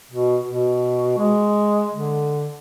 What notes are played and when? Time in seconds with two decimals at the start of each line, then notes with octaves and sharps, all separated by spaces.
0.11 B2
0.48 B2
1.18 G#3
1.93 D3